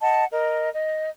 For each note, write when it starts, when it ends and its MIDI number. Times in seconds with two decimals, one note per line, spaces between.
0.01 0.24 75
0.01 0.24 78
0.01 0.24 81
0.30 0.69 70
0.30 0.69 75
0.73 1.09 75